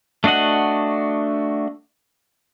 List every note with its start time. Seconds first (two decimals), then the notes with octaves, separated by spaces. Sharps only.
0.24 A3 D4 F#4 D#5 F#5